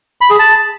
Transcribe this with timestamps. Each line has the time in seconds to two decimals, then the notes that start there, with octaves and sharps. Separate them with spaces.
0.21 B5
0.30 G#4
0.39 A5